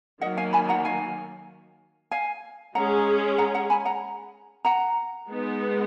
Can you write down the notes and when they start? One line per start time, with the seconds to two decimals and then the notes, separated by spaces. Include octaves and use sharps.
0.21 D#3 F#3 A#3 D#5 F#5
0.37 F5 G#5
0.53 G#5 B5
0.69 F#5 A#5
0.85 F5 G#5
2.11 F5 G#5
2.75 G#3 C#4 G#4 F#5 A#5
3.38 F#5 A#5
3.55 F#5 A#5
3.70 G#5 B5
3.85 F#5 A#5
4.65 F#5 A#5
5.29 G#3 B3 D#4